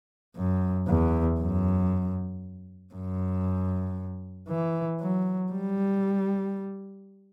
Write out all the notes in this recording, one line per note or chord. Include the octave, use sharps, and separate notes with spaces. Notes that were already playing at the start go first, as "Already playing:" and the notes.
F#2
E2
F#2
F#2
E3
F#3
G3